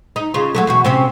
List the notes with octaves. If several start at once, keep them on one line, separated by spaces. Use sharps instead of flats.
D#4
C#3 F4
F#3 G#3 A3
E2 B2 F#4
C3 C4 C#4